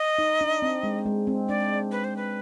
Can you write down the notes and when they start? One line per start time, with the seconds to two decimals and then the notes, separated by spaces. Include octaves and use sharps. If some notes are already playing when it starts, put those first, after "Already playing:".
Already playing: D#5
0.18 D#4
0.41 D4
0.62 C4
0.83 G#3
1.06 G#3
1.27 C4
1.49 D4 D5
1.92 B4
2.04 C5
2.17 B4